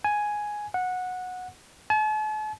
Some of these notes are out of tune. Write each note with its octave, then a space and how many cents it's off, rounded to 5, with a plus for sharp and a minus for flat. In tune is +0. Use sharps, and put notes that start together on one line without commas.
G#5 +5
F#5 -15
A5 -45